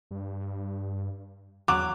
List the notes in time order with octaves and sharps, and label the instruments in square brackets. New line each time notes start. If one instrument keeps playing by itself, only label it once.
[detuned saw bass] G2
[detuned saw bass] E2 [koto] F#3 [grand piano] D6